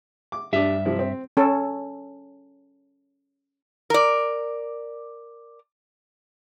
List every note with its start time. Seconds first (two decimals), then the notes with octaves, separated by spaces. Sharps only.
0.32 D6
0.53 G2 G3 D4 E5
0.85 C3 F3 E4
0.99 C4
1.37 C#4 A4
3.90 A#4 D5